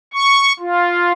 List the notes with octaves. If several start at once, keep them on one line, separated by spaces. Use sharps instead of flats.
C#6
F4